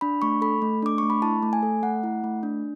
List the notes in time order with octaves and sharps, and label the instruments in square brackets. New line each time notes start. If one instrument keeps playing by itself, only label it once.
[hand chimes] D4 B5
A3 C#6
A4 B5
A3
D4 D6
A3 C#6
B5
E4 A5
A3
G#5
A4
A3 F#5
E4
A3
D4